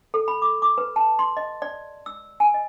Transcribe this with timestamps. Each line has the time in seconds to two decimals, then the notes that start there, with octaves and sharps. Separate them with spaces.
0.14 A4
0.28 B5
0.42 D6
0.62 D6
0.78 B4
0.96 A5
1.19 C6
1.37 D#5
1.62 D5
2.06 E6
2.40 G#5
2.54 D#5